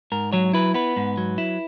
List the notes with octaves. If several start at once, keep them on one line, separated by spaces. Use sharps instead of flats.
G#2 A#4
F#3 C#5
E4 B4
B3 B4
G#2
F#3
E4